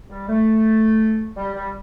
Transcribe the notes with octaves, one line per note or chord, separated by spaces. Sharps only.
G3
A3
G3
G3